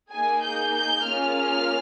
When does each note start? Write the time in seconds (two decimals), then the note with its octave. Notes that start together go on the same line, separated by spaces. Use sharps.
0.11 A#3 D#4 G#4 G#5
0.42 G6
0.74 G6
1.05 A#3 C#4 F4 G#4 F6